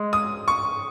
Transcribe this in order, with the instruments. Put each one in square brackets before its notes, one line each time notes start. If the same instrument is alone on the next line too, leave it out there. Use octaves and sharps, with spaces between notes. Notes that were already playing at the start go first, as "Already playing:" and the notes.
Already playing: [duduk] G#3
[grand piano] D#6
C#6